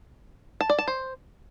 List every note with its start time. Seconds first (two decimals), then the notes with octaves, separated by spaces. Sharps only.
0.61 A5
0.70 D5
0.79 A5
0.88 C5